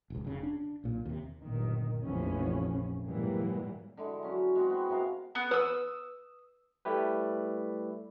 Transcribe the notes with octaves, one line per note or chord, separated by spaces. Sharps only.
E1 C#2
F1 C#3
D4
B1 A#2
D#2 C3
G1 F#2 A#2 D#3
F1 A#1 F2 E3 F3 C#4
G#2 B2 E3 F#3 G3 A#3
D3 G#3 E4
F#3 C#4
G#3 C4 F#4
B3
C3 G#3 A#4 F5
B3
B4 D#6 E6
G3 A3 E4 G4 B4